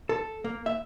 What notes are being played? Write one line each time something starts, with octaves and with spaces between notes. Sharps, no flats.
A4
A#3
E5